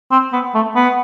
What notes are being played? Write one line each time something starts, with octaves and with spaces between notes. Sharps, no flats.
C4
B3
A3
B3